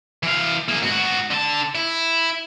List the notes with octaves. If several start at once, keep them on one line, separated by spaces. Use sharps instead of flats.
E3 F5
A#3 G#4
G#2 F#4
D3 A5
E4